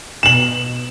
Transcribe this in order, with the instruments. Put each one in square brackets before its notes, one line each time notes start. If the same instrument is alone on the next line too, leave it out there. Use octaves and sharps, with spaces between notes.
[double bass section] B2 [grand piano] E7 F#7